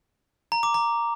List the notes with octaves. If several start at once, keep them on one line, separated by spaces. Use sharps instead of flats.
A#5
D6
A#5